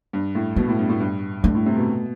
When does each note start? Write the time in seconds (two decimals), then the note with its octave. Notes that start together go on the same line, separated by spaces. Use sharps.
0.13 G2
0.35 A2
0.56 B2 A3
0.68 A2
0.79 G2
0.89 A2
1.00 G2
1.43 G2 A3
1.55 A2
1.66 C3
1.77 B2